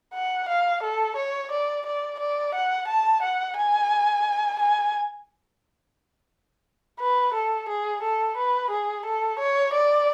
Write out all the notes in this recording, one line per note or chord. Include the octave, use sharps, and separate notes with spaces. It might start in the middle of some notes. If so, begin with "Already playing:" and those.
F#5
F5
A4
C#5
D5
D5
D5
F#5
A5
F#5
G#5
G#5
B4
A4
G#4
A4
B4
G#4
A4
C#5
D5